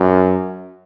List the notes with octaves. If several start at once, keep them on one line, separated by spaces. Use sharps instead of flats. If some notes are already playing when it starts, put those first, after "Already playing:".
Already playing: F#2